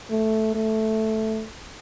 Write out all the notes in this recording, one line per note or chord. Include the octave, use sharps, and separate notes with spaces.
A3
A3